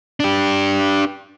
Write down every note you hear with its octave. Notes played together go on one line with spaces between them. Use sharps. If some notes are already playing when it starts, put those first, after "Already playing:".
D4 G4